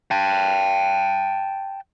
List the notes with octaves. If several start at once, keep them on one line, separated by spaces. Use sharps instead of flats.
G5 A5